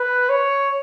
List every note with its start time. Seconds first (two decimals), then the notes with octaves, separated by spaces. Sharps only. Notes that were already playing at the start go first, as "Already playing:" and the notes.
Already playing: B4
0.29 C#5